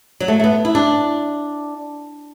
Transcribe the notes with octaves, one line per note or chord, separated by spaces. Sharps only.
F#3
A3
A3
B3
E4
D4